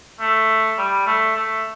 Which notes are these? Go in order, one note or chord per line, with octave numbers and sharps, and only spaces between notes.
A3
G3
A3
A3